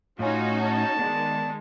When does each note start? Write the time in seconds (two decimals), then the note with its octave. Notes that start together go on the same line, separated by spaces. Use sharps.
0.19 A2 A3 C#4 D#4 F4 F#4 G#5
0.60 A5
0.99 D#3 G#3 B3 D5